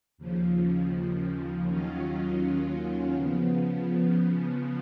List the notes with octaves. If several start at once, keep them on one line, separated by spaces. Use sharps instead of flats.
D#2 C#3 F3
D#2 D#3 F#3 C#4 F4
C#3 F3 B3